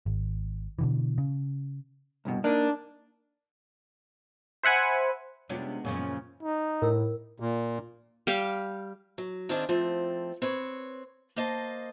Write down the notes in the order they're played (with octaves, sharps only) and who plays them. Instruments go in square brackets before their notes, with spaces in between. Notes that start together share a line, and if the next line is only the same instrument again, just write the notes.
[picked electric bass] G#1
B2 D3 E3
C#3
[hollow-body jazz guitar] C2 G2 B2
[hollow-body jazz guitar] A#3 D#4 [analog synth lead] D4
[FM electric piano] C5 E5 F#5 G#5 B5
[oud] C3 C#4 D4 [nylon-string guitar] G3 F4 D5 [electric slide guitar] G#3 B3
[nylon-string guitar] F#2 [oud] A#2 C#3 F3 [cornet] C#4
[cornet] D#4
[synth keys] A2 [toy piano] A#4 E6
[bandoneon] A#2
[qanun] G3 G4 F5
[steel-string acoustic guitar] F#3
D#3 C4 D4 F4 G#4 D#5
F3 A3 C4
C4 B4 C#5
A#3 C5 D#5 A5